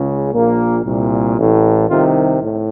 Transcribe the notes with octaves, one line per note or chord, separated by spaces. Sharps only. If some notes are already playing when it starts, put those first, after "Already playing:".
Already playing: C#2 C#3
A#1 A#2 A#3
C2 A#2
A1 A2
C2 C3 D#3 F4
A2